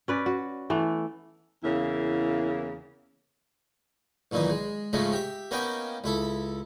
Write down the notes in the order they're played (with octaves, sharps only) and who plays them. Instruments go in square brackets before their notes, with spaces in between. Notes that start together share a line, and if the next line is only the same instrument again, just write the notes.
[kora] C#4 B4 D5
F#4
E3 A3 B3
[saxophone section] E2 C#3 A#3 E4
[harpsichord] B1 A#2 D#3 E3 D#4
G#3
G#2 C#3 F3 G#3 A3
G4 E5
A#3 B3 C#4 D#4 G5 G#5
C#2 E4 A4